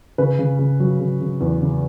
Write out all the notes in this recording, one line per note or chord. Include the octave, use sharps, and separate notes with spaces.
C#3 B4
C#3
C#3
F#3
C#3
C#3
E2
C#3